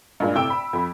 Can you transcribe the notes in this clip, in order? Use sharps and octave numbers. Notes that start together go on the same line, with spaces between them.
G2 A#2 G#3
A2 C3 G5 E6 D7
B5
F2 B5